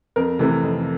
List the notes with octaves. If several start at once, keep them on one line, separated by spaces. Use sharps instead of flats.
F2 A#4
C3 E3 A3
F2